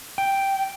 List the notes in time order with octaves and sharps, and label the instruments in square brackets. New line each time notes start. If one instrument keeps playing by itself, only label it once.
[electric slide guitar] G5